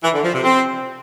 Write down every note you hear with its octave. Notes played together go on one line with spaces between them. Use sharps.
E3
D3
F3
C3
C4